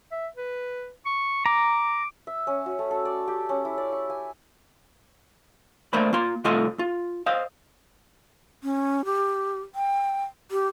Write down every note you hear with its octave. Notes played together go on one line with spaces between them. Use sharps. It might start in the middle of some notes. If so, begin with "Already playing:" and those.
E5
B4
C#6
A#5 D6
E5
C#4
F#4
A3
A4
D5
G4
C#4
E4
D5
C#6
G#5
A3 A#3 D4 C5 B5
A#3 F4 C6
C2 A3 F4 A4 D#5 C6
F4
C5 D#5 F5
C#4
G4
G5
G4